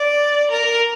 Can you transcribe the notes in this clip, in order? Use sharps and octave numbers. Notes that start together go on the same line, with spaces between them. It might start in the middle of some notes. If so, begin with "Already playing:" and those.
Already playing: D5
A#4